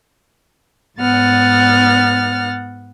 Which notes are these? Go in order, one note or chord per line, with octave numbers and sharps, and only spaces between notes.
G#2 B3 F#5 F6 A6